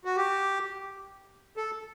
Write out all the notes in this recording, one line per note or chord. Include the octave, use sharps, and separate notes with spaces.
F#4
G4
A4